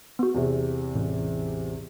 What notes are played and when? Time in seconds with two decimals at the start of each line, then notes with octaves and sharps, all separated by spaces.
0.19 B3 F#4
0.34 E2 C3
0.95 A1